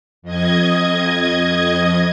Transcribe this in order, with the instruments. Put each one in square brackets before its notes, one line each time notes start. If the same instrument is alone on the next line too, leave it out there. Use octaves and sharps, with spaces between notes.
[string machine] F2 D#5 G#6